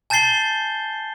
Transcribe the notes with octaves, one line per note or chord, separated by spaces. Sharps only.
G#5 A5 G6 A6 C7 G7